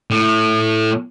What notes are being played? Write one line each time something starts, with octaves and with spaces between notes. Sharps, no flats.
A2